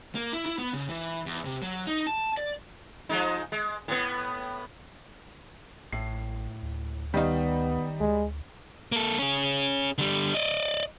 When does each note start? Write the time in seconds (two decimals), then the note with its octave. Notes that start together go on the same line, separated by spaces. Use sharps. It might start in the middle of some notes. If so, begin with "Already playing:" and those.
0.15 A#3
0.33 E4
0.46 E4
0.58 B3
0.73 C#3
0.89 E3
1.26 E2
1.45 C3
1.62 F#3
1.87 D#4
2.07 A5
2.37 D5
3.09 F3 G#3 D#4
3.52 G#3
3.88 A2 B3
5.92 A1 A2 C7
6.62 D2
7.14 D2 D#3 G3 B3 D#4 F5
8.00 D2 G#3
8.92 A#3 A4
9.19 C#4 G#4
9.98 D3 G3
10.35 D5 D#5